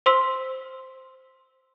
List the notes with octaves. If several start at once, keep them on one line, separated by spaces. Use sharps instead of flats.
C5 C6 E6 B6